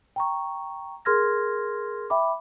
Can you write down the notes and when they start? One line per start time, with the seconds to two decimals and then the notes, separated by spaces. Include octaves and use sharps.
0.16 G5 A#5 C#6
1.05 G#4 A#4 C6 F6 G#6 A#6
2.10 E5 G5 B5 D6